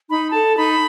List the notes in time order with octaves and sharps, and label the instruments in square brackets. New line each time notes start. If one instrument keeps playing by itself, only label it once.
[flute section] D#4 B5
A4 A5
D#4 B5